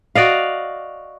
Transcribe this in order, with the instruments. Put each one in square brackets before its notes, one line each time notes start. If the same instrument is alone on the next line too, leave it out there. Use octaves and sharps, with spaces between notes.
[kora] F#4 D5 D#5 F5